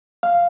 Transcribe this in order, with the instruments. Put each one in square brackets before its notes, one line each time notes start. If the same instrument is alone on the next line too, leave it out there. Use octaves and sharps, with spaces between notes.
[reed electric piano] F5